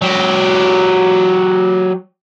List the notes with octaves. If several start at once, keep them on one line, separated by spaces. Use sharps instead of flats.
F#3 G4